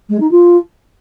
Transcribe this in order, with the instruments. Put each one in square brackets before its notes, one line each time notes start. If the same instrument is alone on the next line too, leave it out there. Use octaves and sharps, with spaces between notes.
[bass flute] G#3
D#4
F4